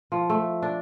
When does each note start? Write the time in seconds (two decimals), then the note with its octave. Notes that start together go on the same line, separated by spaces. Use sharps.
0.12 F3
0.30 A3
0.63 D4